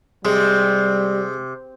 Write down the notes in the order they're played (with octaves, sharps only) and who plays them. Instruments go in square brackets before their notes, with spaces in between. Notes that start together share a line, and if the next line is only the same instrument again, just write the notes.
[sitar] C3 [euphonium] G3 [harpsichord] G#3